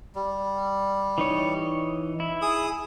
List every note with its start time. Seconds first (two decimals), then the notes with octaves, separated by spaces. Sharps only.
0.15 G3
1.18 E3 D#4 C#5
2.20 E4
2.42 G#4 D#6